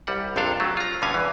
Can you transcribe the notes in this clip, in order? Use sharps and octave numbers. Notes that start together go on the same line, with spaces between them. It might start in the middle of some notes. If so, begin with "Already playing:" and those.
C2 G3 F#5
A#1 F2 C3 D4 A4 F5
F#3 A3
F4 A#5
G2 B2 D3 C#4 F5 G#5
E2 E3